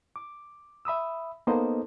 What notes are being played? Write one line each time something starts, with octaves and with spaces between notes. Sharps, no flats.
D6
E5 B5 D#6 E6
A#3 B3 D#4 A4 C5 D#5